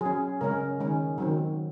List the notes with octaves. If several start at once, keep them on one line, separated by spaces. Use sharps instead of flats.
F#3 C#4 G#4
C#3 G#3 C#4 A#4
D#3 G#3 C#4
D#3 F#3 C4